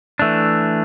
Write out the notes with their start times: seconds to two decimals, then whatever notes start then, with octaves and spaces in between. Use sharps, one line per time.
0.19 E3 A3 D4